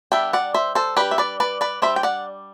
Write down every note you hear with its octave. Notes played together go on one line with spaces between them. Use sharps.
G3 B3 D4 E5 G5
D5 F#5
C5 E5
A4 C5
G3 D4 G4 B4
E5
B4 D5
B4 D5
B4 D5
G3 D4 C5 E5
G5
D5 F#5